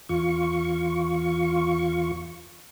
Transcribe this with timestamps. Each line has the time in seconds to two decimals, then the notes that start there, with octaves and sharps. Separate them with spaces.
0.09 E2 F4 C#6